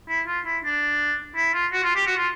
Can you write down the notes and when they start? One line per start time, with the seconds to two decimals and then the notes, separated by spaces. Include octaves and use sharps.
0.09 E4
0.27 F4
0.45 E4
0.64 D4
1.36 E4
1.53 F4
1.73 F#4
1.84 F4
1.96 G4
2.07 F#4
2.17 F4